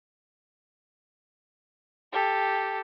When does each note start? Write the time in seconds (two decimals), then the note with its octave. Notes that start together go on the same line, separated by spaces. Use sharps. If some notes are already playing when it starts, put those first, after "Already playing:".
2.12 G4 A4